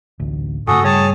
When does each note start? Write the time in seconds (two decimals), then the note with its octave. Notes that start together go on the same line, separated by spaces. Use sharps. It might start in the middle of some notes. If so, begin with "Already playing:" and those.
0.20 A1 D2
0.68 G2 C#3 A3 F#4 A4 G#5 D#6
0.84 G3 G#4 C#5 A5